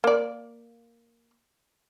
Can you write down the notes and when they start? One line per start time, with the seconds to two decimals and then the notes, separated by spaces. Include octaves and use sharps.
0.04 A#3 D5